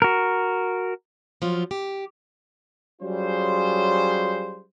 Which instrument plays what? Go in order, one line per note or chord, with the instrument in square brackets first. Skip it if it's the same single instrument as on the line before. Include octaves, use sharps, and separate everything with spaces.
[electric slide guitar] F#4 A#4
[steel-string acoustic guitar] F3 F#3 F4
G4
[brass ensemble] F#3 G3 C#4 F4 G#4 C5